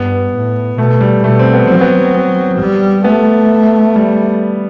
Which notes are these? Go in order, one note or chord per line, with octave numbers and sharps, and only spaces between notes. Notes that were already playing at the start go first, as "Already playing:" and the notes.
Already playing: G2 B3
A2
B2 A3
G3
B2 A3
C4
B3
F#3 C4
B3
B3
G3
A3 B3
G3